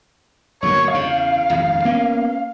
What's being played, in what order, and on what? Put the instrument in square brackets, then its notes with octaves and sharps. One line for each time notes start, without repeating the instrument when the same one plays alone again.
[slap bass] G1 F#3 A#3 [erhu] C#5
[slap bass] E2 C#3 [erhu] F5
[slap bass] D#1 F2 G#2
A#3 B3 C#4